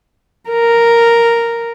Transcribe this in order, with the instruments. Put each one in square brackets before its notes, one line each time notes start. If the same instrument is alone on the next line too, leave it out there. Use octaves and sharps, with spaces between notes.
[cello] A#4